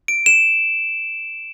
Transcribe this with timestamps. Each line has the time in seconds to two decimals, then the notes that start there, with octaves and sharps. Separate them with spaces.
0.08 D7
0.26 E7